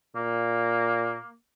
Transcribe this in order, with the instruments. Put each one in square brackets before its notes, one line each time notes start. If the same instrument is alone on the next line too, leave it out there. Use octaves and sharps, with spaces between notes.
[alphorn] A#2 [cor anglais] A#3